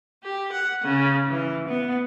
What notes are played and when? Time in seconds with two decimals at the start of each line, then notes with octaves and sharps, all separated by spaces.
0.22 G4
0.52 F#5
0.83 C#3
1.26 E3
1.68 B3